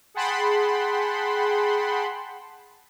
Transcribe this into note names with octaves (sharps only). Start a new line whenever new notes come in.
G#4 F#5 G5 A5 B5 C6